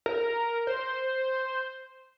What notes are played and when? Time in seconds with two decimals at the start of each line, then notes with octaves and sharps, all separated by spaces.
0.06 A#4
0.67 C5